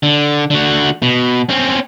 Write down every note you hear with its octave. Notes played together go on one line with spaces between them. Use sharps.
D3
D3 F#4
B2
C4 C#4